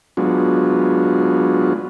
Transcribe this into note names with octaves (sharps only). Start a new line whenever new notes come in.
F#3 G#3 B3 D4 F4 F#4